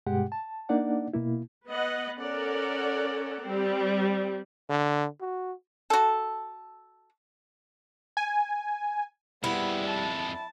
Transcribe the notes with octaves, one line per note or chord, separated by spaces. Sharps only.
G2 B2 G#3 G4 F#5 G5
A5
A#3 D4 D#4 D5 F#5
B2 A#3 E4
B3 B4 D#5 F#5
C#4 A4 A#4 D5 F#5
G3 C4
D3
F#4
F#4 A4
G#5
F2 G3 G#3 B3 E4
A5